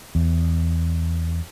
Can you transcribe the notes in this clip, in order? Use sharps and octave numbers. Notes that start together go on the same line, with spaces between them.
E2